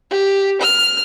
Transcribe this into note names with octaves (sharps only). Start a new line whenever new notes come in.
G4
F6